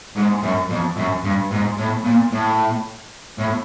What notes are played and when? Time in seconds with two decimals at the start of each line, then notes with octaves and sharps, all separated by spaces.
0.16 G#2
0.43 F#2
0.70 F2
0.97 F#2
1.24 G2
1.51 G#2
1.78 A2
2.04 A#2
2.32 A2
3.38 A2